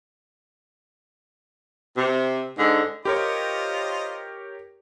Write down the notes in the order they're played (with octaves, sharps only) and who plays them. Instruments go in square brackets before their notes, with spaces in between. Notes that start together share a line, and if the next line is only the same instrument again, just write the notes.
[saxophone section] C3
G#2 D3
[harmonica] F4 C5 D#5 [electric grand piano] G4 A#4 C#5